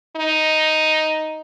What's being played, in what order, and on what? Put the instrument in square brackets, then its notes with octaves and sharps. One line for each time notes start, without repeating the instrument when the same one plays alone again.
[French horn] D#4